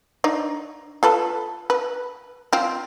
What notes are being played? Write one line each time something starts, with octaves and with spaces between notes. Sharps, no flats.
D4 D#4
F4 A4 B4
B4
C4 F4